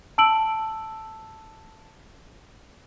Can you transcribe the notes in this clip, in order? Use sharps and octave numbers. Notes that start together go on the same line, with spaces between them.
A5 E6 D7 F#7